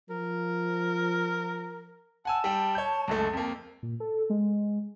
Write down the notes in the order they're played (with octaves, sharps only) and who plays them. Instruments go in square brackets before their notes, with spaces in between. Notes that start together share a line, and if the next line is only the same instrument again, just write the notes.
[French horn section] F3 [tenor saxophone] A#4
[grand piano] F#5 G#5 E6 [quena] A5
[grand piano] G3 G5
C#5 G6
C#2 F#2 A3
F2 A#3
[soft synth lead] A#2
A4
G#3